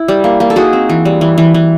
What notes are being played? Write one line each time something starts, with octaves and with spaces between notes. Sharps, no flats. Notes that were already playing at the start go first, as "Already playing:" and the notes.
Already playing: E4
G3
A#3
A#3
A4
D#4 F#4 G#4
C4
E3
G3
E3
E3
E3